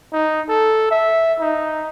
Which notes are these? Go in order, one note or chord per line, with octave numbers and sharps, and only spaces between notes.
D#4
A4
E5
D#4